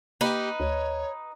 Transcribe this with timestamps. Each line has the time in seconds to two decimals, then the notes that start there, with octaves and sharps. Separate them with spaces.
0.21 A#3 D#4 G4 B4
0.60 D2 C#5